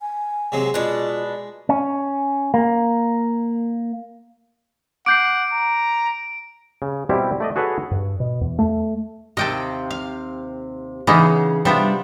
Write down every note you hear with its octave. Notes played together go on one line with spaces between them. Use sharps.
G#5
C3 F#3 G#3
B2 G#3 D4 F4
C#4
A#3
F#5 D6 G6 C7 D7
A#5
C#3
B2 G3 C4 E4 G4
A3 D5 D#5
F#4 G#4 A4 B4 C#5 F#5
G2
B2
E2
A3
D#2 C3 D#5 G5 A5
F5
C#3 E3 B3 D#4
C3 G3 B3 D4 F4 E5